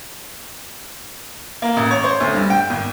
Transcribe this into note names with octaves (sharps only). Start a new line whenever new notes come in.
A#3
A1
C#5
C5
D2
G2
G5
G#1